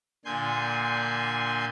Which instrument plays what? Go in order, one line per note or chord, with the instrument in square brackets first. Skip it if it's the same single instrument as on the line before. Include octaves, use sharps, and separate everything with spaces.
[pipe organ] A#2 D3 G#5 C6 G6